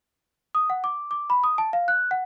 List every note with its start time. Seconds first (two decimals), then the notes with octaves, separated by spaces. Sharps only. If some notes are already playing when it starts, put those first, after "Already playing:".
0.55 D#6
0.70 F#5
0.84 D6
1.11 D6
1.30 B5
1.44 D#6
1.58 A5
1.73 F5
1.88 F#6
2.11 F#5